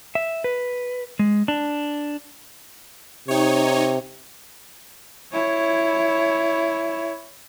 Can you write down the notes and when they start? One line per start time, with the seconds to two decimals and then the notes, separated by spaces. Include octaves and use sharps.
0.15 E5
0.44 B4
1.19 G#3
1.48 D4
3.28 C3 D#4 C#5
5.33 E4 C#5